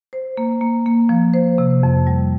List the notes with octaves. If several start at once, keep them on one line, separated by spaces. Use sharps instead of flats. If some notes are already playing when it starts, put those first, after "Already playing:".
C5
A#3
A#3
A#3
F3
C5
C3
F2
G3